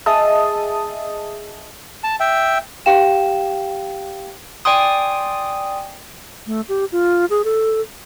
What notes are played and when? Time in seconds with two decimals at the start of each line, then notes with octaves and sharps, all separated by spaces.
0.06 G#4 D#5 E5 A5 D#6
2.04 A5
2.20 E5 G5
2.86 G4 F5 G5 E7
4.65 D5 G5 G#5 C6 D#6
6.47 A3
6.69 G4
6.92 F4
7.30 G#4
7.45 A4